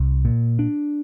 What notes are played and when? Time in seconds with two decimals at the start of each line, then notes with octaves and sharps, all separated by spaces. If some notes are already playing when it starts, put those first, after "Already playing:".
Already playing: C2
0.25 A#2
0.59 D4